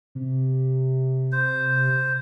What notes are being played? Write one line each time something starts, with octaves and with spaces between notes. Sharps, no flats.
C3
C5